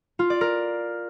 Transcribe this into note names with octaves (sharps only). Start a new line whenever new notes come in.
F4
D5
A#4